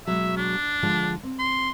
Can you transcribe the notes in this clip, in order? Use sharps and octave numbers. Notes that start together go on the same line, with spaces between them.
B2 F#3 G#3 E5
D4
D3 F3 G#3
C4
C6